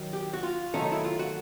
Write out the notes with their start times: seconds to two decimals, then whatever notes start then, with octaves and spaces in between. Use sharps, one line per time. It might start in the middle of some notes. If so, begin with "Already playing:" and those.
Already playing: D#3 F#3
0.13 G4
0.33 F#4
0.43 F4
0.74 D#3 F#3 A3 C#4 D#4
0.92 E4
1.04 F4
1.19 F#4